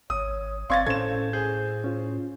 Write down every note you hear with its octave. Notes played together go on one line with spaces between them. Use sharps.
G#1 C#5 D#6
G1 C4 D5 F5 C6 C#6 G#6 A6
A2 C#4 A4 C5 G#6 E7
G#4 C5 G6
C#4 F4